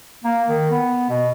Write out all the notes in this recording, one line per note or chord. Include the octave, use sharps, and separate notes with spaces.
A#3
D#3
B3
B2